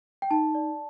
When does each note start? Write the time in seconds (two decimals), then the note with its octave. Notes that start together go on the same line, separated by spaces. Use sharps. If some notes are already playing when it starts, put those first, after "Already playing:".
0.22 G5
0.31 D#4 A5
0.55 D5